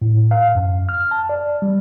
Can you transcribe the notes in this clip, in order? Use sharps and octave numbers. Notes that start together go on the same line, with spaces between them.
A2
F5
F#2
F6
A5
D5
G3